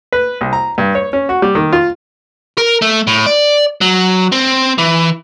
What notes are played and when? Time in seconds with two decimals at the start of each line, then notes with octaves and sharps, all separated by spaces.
0.12 B4
0.41 C2
0.53 A#5
0.78 G2
0.95 C#5
1.13 C#4
1.29 F#4
1.42 G3
1.55 D#3
1.73 F4
2.58 A#4
2.82 A3
3.07 A2
3.26 D5
3.81 F#3
4.32 C4
4.78 E3